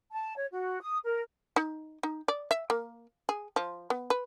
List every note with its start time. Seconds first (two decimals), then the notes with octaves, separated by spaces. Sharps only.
0.12 A5
0.37 C#5
0.51 F#4
0.81 D#6
1.05 A#4
1.56 D#4
2.03 D#4
2.28 D5
2.51 E5
2.70 A#3
3.29 G#4
3.56 F3
3.90 B3
4.10 B4